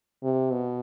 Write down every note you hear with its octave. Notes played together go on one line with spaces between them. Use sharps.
C3
B2